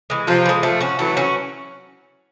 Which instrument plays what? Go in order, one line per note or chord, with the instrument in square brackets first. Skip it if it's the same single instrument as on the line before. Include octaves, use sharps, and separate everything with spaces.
[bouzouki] E3 G#3
[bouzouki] C3 [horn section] F3
[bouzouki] E3 G#3
[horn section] F3 [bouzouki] A3
[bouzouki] C#4 F#4
[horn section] E3 F#3 [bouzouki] A3
[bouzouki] C#4 F#4